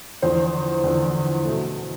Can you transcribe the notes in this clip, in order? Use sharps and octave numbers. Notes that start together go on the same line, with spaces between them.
E2 D3 F3 C5
E2 D3 F3
B2 A3